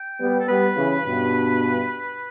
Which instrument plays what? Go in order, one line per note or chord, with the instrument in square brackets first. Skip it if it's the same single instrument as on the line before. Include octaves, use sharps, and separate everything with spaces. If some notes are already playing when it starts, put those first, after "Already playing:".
Already playing: [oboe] G5
[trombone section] G3 B3
[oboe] A4
[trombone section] G3 B3 [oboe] B4
[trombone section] C#3 E3
G2 B2